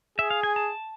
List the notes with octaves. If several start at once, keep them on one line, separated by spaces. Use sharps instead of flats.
G#4 E5
F5
G#5
A5